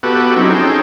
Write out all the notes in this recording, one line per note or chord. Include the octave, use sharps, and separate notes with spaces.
B3 F#4 G4 A4 B4
F#3 C4 C#4 D#4 E4 G4
C#4 D#4 G#4 A4 C5 G5